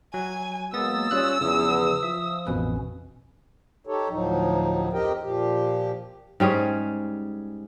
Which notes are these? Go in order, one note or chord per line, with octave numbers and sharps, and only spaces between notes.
F#3 G#5
F#3 G#3 A#3 B3 D#6 E6 A6
G3 C#4 F4 F#6
E2 C#3 F3 D#6
F3 E5
A1 F2 B2 C#4 B4
D#4 G4 A4 C#5
D2 A2 F3 F#3 D#4
F2 C4 G4 A#4 D#5 G5
A#2 F3 G4
G#2 G3 C#4 G#4